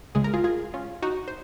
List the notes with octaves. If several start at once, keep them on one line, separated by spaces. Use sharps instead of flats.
C#2 C#3 G#3 G#4
A#4
F4 G#4
F4 G#4
C#4 F4
D#4 F#4
C5